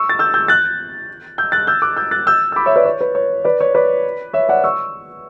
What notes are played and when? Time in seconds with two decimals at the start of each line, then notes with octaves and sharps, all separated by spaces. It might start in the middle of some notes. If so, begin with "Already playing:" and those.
Already playing: C#6 E6
0.09 A6
0.19 E6 G6
0.34 E6 G6
0.48 F#6 A6
1.38 E6 G6
1.52 F#6 A6
1.67 E6 G6
1.82 D6 F#6
1.97 E6 G6
2.11 F#6 A6
2.27 E6 G6
2.52 E6
2.56 B5 D6
2.66 C#5 E5
2.76 B4 D5
2.85 C#5
3.01 B4
3.15 C#5
3.45 B4 D5
3.61 C#5
3.75 B4 D5
4.33 C#5 E5
4.49 D5 F#5
4.64 C#6 E6